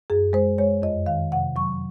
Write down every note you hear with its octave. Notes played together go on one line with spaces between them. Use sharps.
F#2 G#4
G#3 C5
G#3 C#5
F2 D#5
D#3 F5
C3 F#5
F#3 C#6